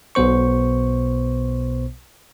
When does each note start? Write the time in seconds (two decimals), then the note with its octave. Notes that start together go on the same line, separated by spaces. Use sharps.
0.15 B1 B2 B3 C5 C#6